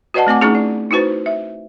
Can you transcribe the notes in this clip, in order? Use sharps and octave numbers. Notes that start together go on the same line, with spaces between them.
F#4 B4 D5 D#5 F#5 A5
A3 C4 G#5 D6
A3 C#4 D#4 E4 G#4
D5
D#4 E4 F#4 B4 C5
E5